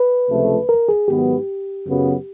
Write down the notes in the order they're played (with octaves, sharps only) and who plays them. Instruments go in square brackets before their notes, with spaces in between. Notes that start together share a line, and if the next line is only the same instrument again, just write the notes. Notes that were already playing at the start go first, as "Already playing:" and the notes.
Already playing: [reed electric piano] B4
[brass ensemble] C#2 C3 F3 A3
[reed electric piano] A#4
G#4
[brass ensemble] G#2 D#3 F#3 B3 [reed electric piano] G4
[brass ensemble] F#2 C#3 F#3 B3